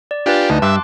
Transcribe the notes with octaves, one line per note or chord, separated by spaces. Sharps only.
D5
D4 F4 G4 B4 G#5
D2 D#4 A5
G2 E5 C6 D6 F#6